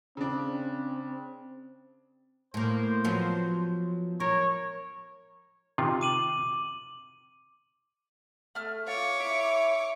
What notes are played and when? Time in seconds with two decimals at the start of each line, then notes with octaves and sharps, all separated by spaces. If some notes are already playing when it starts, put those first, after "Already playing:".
0.17 C#3 C4 D4
2.54 A2 A#3 C5
3.04 F3 F#3 B3
4.20 A#4 C#5
5.78 C3 D#3 F4
6.01 D6 D#7 F#7
8.55 A3 F6
8.88 F4 C#5 D6
9.20 E4 E5